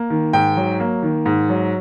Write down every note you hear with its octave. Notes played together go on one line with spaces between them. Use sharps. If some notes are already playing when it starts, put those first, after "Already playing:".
Already playing: A#3
D#3
G#2 G5
F#3
A#3
D#3
G#2
F#3